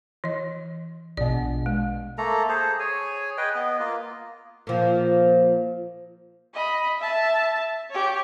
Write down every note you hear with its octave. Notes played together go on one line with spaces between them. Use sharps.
E3 D#5
A#1 B2 D5
G#3
A3 A#3 A4 A#5
G#4 A4 C5
G#4 C#5 G#5
G#4 B4 D#5 G5
B3 D#5
A#3 F4
A#2 F3
D#5 B5
E5 A5
G4 C#5